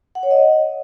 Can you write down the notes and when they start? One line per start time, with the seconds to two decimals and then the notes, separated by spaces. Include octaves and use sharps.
0.15 F#5
0.23 C#5
0.31 D#5